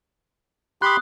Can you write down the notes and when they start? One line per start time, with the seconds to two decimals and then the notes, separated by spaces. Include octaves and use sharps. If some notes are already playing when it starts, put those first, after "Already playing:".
0.82 G4 B5 C6 D#6 F#6